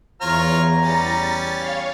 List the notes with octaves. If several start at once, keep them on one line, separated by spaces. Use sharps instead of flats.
E2 F4 C#5 A#5 F6
G3 C#4 A6
C#5 F5